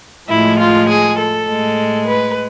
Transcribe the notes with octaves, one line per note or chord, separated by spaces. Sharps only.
A2 F3 G#3 E4
F4
G#4
A4
A2 G#3
B4